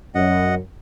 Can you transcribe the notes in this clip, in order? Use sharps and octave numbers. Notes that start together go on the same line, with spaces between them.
F#2 D#5 F#5